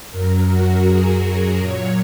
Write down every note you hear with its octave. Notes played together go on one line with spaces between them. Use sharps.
F#2 F#3 A#4
F#4
G#4
A#2 F#3 C#5